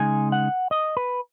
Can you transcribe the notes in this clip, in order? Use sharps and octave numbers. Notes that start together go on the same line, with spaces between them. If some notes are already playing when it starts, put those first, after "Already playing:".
Already playing: C#3 G#3 D#4 G#5
F#5
D#5
B4